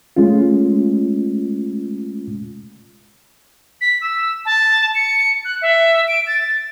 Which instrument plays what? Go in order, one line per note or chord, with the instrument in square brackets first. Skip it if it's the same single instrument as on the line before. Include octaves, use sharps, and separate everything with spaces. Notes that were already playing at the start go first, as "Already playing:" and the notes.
[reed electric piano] G#3 A3 C#4 F4
[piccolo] B6
E6
A5
C#7
F#6
E5
D7
A6